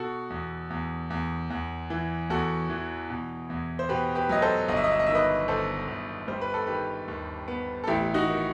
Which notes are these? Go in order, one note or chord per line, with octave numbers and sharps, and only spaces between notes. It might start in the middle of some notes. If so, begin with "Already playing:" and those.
Already playing: B2 F#4 A4
E2
E2
E2
E2
E3
E2 F#4 A4
E3
B2
E2
C5
B2 G4 B4
G4 B4
F#3 D#5
A4 C5
G1 D#5
E5
D#5
E5
D#5
D#3 E5
B4 D#5
G1 A4 C5
G1
G3 C5
B4
A4
D#3 G4 B4
D#2
B3
A4
A1 E4 G4
D#4 F#4
D#3